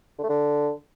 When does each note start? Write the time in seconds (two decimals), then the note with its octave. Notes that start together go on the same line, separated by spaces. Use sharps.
0.18 D3
0.24 A3
0.29 D3